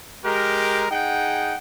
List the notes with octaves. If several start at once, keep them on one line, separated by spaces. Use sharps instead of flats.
G#3 G4 A#4
D#4 G#4 F#5 G5